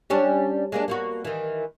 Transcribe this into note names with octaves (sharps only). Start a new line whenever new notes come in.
G3 C#4 D4
G#3 A#3 D4
A#3 B3 F#4
D#3 E3